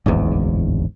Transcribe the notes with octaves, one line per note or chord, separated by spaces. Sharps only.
D1 G#1 E2 G#2